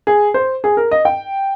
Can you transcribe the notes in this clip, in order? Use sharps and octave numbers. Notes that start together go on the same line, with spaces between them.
G#4
C5
G#4
A#4
D#5
G5